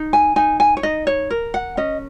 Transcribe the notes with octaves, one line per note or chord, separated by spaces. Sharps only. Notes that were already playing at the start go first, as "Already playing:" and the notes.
Already playing: D#4
G#5
D#4 G#5
G#5
C#5
D#4 D#5
C#5
A#4
F#5
C#4 D#5